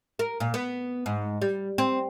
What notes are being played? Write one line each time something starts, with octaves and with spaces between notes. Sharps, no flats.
A#4
A#2
B3
G#2
G3
C4